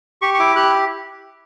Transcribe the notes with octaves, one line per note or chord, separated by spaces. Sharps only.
G4 C#6
C#6
E4 D6
G4 F#6